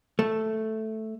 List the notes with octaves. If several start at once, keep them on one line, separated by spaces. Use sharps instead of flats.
A3